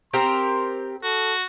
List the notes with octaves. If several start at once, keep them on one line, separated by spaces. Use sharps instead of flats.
C4 G4 A#4 C6
F#4 A4